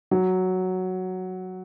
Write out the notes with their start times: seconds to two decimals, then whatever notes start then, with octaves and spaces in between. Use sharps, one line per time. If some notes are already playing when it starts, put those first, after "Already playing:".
0.11 F#3